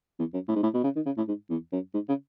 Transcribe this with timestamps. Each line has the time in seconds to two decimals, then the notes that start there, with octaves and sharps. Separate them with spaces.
0.19 E2
0.33 F#2
0.48 A2
0.55 G#2
0.63 A2
0.74 B2
0.84 C#3
0.96 D#3
1.05 C#3
1.17 A2
1.28 G#2
1.50 E2
1.72 F#2
1.93 G#2
2.08 C#3